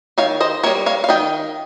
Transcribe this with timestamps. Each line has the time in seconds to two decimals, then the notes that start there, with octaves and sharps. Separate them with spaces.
0.18 D#3 C#5 F5
0.40 C5 D#5
0.63 G3 A#3 A#4 C#5
0.86 C#5 F5
1.04 F5
1.09 D#3 D#5 G5